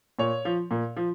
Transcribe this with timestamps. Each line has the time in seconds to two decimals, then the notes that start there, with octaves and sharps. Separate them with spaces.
0.19 A#2 C#5
0.45 F3
0.71 A#2
0.97 F3